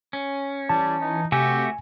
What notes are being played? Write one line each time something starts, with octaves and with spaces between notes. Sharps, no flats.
C#4
E3 G3 A5
D#4
C3 A3 F#4 G4 E5 G#5